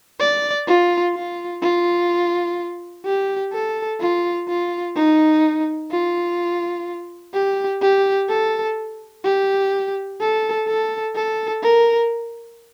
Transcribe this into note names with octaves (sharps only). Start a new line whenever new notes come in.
D5
F4
F4
F4
G4
A4
F4
F4
D#4
F4
G4
G4
A4
G4
A4
A4
A4
A#4